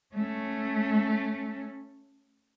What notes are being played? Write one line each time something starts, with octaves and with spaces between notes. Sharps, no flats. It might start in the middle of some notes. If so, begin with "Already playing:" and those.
A3 C#4